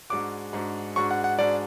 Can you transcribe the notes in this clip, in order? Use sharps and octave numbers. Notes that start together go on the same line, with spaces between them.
G#2 G#3 D4 F#4 D6
G#2 G#3 D4 F#4
G#2 G#3 D4 F#4 C#6
F#5
F#5
G#2 G#3 D4 F#4 D5